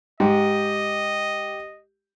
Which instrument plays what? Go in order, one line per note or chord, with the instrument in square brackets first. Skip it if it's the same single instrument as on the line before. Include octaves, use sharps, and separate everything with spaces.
[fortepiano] G#2 [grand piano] G4 [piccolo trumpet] D#5